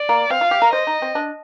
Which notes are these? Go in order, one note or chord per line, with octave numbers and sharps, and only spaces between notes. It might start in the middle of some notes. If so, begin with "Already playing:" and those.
Already playing: D5
A#3
C4 F5
F4
G4
A#4
C5 D#5
D#4
C4
D4